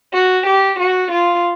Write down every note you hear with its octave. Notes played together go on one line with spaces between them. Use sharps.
F#4
G4
F#4
F4